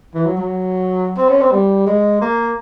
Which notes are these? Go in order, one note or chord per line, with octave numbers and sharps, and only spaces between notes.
E3
F#3
F#3
C4
C#4
C4
G3
G#3
A#3